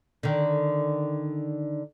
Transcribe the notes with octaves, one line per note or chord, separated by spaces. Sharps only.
D3 D#3